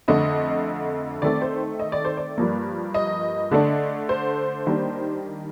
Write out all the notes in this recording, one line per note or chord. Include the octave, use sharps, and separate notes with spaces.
F2 D3 A3 D#5
D#3 A3 C4 D5
C5
D#5
D5
C5
D5
G2 F3 A#3
D#5
D3 A3 D4
C5
D#3 G3 A#3 D4